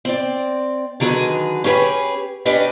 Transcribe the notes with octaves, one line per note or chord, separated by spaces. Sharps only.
C4 D5
D3 D#3 F#3 G#4 B4
C#4 G4 G#4 B4
C#4 D4 G4 B4 D#5